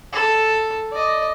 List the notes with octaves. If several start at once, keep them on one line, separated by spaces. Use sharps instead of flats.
A4
D5 D#5